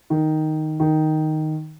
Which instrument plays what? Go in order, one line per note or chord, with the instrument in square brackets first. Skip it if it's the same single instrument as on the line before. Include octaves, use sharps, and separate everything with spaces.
[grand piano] D#3
D#3